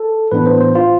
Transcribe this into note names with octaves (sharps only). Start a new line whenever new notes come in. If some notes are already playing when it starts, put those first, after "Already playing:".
Already playing: A4
A2 E3 B3 D4 B4
C5
C5
F4